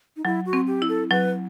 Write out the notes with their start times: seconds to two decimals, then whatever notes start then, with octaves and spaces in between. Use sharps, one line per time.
0.17 D#4
0.25 F#3 E4
0.46 F#4
0.53 C4
0.67 G4
0.82 E4
0.89 A4
1.11 F#3 B4